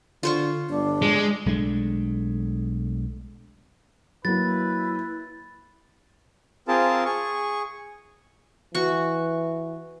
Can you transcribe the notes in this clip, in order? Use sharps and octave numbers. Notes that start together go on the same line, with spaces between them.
D3 F4 C5 C#6
G1 D4
G#3
B1 G#3 A3 D4
F#3 A#3 E4 B4 A6
C4 F4 G#4 A#4 A5
G#4 C#6
E3 F#4 C#6